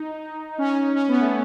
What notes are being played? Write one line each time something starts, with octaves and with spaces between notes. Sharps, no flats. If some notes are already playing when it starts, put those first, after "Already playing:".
Already playing: D#4
C#4
C#4
B3
A3